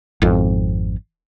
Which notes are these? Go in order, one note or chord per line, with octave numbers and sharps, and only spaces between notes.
G#1 F2